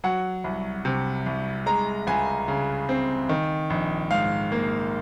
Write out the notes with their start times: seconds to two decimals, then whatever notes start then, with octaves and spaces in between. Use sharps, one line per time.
0.04 F#3 F#5
0.44 C2
0.85 C3
1.26 C2
1.66 G#3 A#5
2.07 C#2 G#5
2.48 C#3
2.89 C4
3.29 D#3
3.70 A#1
4.11 G#2 F5
4.52 A#3